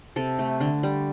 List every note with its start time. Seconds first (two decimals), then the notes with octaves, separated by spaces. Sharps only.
0.16 C3 A4
0.39 A3
0.60 D3
0.83 G3